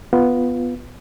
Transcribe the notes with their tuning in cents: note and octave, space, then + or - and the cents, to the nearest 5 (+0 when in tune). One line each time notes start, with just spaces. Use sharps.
B3 +0 F4 -5